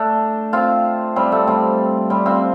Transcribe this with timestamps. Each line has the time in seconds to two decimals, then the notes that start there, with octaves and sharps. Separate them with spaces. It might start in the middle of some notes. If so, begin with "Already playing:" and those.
Already playing: A3 D4
0.53 C4 F4
1.16 G3 C4
1.32 A3
1.47 G3 C4
2.10 G3 C4
2.26 C4 F4